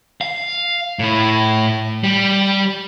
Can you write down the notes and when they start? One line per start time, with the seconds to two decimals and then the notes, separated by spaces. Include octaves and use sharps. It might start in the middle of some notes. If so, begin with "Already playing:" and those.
0.21 F5
0.99 A2 E4
2.04 G3